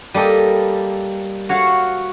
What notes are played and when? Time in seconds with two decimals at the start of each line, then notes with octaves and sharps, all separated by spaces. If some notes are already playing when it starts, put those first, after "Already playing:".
0.14 G3 A#3 A4 D#5 G5
1.49 F#4 C#5 F5 F#5